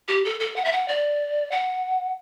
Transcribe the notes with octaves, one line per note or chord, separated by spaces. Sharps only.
G4
A4
A4
F#5
E5
F#5
D5
F#5